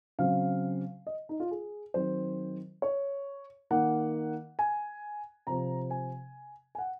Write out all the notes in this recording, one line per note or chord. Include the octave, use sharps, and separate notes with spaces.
C#3 F#3 C4 F5
D#5
D#4
F4
G#4
D#3 F#3 C4 C5
C#5
D#3 A#3 F#5
G#5
C3 F3 C4 A#5
G#5
G#5
F#5